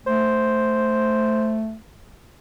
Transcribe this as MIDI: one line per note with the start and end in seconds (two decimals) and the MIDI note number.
0.07 1.76 57
0.07 1.57 72